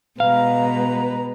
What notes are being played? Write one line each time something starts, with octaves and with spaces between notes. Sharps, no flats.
B2 G#3 B4 F5 A#5